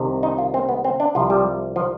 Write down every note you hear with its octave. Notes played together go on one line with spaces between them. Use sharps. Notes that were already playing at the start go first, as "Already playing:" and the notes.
Already playing: C2 C3 D#3
D#4
F4
C4
B3
C4
D4
C2 C3 F3 F4
G3
F3